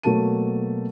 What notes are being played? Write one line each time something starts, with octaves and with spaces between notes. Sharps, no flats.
B2 F#3 A3 A#3 A5 D#7